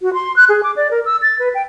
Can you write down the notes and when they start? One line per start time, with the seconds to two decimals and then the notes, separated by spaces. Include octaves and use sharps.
0.01 F#4
0.14 C6
0.36 F#6
0.49 G#4
0.63 D6
0.76 D5
0.91 A#4
1.05 E6
1.22 A6
1.39 B4
1.55 G5